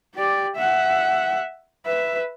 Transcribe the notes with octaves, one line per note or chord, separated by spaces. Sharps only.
G4 D5
E5 F#5
B4 E5